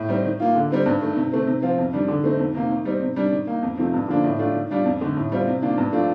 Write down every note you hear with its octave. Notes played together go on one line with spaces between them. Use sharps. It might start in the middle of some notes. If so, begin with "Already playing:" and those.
Already playing: A2
G3 C4 D#4
D#3
A#3 F4
D3
G3 C4 D#4
G2
D#3 A3
C3
D#3 A3 C4
C3
F3 C4 F4
F2
D#3 G3 D4
D3
A3 C4 D#4
F2
C3 D#3 A#3
D#3
G3 C4 D#4
C3
G3 D4
D#3
A#3 D#4
F2
C3 F3 A3 D#4
G2
D3 F3 A#3 D4
A2
A3 D4 F4
D#3
G3 D4 F4
F2
D3 A3 D#4
A2
G3 C4 F4
C3
D#3 A#3 D4 F4
G2
F3 A3 D4 F4